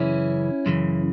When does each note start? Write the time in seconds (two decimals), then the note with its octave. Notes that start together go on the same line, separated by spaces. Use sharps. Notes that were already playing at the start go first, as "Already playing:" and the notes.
Already playing: F#2 C#3 E3 C#4 E4
0.66 F#2 C#3 E3